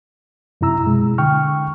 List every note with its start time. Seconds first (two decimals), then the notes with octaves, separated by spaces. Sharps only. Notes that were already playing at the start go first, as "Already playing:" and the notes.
0.61 F#2 C3 E4 A#5 E6
0.84 B2 G#3
1.18 D3 G5 C#6 F6